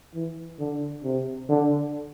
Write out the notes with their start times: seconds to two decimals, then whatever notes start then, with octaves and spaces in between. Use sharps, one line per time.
0.14 E3
0.60 D3
1.04 C3
1.50 D3